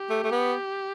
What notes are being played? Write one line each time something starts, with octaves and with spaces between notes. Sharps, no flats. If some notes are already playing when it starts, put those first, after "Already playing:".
Already playing: G4
A3
A3
B3